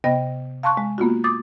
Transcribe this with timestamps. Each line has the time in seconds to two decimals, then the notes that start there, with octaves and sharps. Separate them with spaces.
0.04 C3 B3 D#5 G5 A#6
0.63 F5 A5 C6 C#6 F#6
0.77 G#3
0.98 A#3 B3 F4 F#4
1.24 D6 D#6 A6